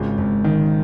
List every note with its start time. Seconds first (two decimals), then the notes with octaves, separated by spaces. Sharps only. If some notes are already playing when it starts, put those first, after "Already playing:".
Already playing: G#1 C#3 F4
0.18 G#1
0.44 D#3